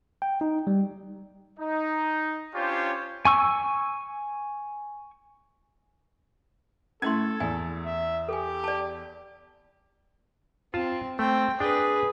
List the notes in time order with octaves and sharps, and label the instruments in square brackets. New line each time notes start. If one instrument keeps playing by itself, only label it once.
[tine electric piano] G5
D#4
G3
[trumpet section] D#4
C#4 D4 F4 G4 C5 C#5
[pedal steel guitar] G#5 C#6 E6
[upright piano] A3 G#6 [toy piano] C#4 E4 C6 [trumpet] A4
[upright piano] E2 [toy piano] G#5
[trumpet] E5
[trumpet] G4 [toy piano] A4 G#5
[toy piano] D5 A5
[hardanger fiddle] C4 [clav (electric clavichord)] F4 A5
[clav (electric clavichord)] A3 [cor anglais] C4 [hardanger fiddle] G5
[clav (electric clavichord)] D4 G5 [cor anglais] G#4 [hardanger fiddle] B4